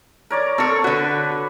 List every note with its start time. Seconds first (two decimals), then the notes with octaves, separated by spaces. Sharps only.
0.30 A#4 C#5 D5
0.58 C4 A4 C#5
0.84 D3 F#4 B4